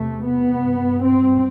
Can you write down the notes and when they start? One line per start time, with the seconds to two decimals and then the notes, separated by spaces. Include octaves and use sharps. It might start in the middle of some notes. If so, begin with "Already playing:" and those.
Already playing: E2 C3 A3
0.26 B3
0.64 G2
1.03 C4